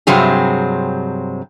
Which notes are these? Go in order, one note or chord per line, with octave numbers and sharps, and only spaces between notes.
G2 C3 F#3 C4 G#4